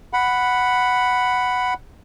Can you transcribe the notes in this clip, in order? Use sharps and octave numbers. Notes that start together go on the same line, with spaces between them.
F#5 B5